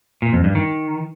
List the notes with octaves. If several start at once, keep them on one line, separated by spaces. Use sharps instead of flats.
A#2
F2
G2
D#3